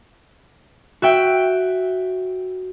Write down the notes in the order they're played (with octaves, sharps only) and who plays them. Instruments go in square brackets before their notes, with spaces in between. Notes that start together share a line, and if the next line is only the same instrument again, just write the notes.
[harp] F#4 E5 G5